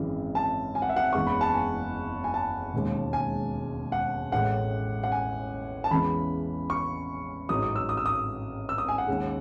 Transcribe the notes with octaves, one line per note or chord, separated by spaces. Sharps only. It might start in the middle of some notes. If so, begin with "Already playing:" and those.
Already playing: G#1 F#2 C#3 E3 G#3
A5
G#5
F#5
E5
F#5
F#1 E2 C#3 G#3 C#6
B5
A5
G#5
G#5
A5
E1 D#2 C#3 G#3
G#5
F#5
A1 A2 G#3 F#5
F#5
G#5
A5
E2 C#3 E3 G#3 B5
C#6
A1 G#2 F#3 D#6
D#6
E6
D#6
E6
D#6
E6
D#6
G#5
F#5
D#2 C#3 G#3